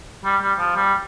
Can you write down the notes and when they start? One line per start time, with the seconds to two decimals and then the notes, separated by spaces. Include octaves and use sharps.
0.25 G3
0.41 G3
0.59 F3
0.76 G3